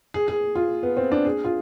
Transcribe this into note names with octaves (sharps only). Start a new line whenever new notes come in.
G#4
G#4
F4
B3
C4
D4
G#4
F4